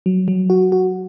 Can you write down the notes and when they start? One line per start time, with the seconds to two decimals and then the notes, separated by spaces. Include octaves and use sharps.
0.06 F#3
0.28 F#3
0.50 F#4
0.72 F#4